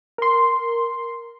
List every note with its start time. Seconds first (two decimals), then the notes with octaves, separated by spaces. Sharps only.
0.18 A#4 C6